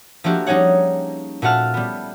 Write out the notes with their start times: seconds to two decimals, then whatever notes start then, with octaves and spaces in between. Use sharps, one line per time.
0.24 F3 A3 A#3 D4 F#4 G4
0.47 G3 C#4 D#4 G#4 C#5 F#5
1.42 A#2 A3 F#4 F#5 A5 F6
1.74 G3 B3